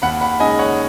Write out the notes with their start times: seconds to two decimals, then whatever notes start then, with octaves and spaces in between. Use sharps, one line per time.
0.02 D#2 F#5 B5
0.21 F#5 B5
0.40 C#3 G#3 D#4 D#5 G#5
0.59 C#5 F#5